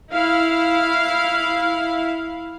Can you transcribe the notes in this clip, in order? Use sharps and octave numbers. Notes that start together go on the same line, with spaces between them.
E4 F5